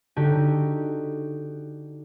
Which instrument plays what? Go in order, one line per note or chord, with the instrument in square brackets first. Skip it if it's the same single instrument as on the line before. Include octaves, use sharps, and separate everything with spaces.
[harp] D3 D#4 F#4 G4